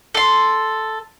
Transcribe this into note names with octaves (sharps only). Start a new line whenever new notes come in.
A4 C6